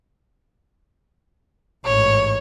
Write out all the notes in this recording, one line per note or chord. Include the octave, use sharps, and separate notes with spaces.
A1 G#2 C#5